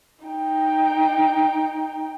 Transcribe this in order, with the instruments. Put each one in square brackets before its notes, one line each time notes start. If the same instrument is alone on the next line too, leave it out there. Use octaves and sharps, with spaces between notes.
[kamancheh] D#4 G5